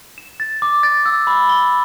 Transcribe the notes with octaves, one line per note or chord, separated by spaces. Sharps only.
E7
A6
D6
A6
E6
B5
G7